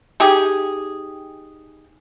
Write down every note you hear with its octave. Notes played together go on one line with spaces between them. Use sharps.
D#4 G4 G#4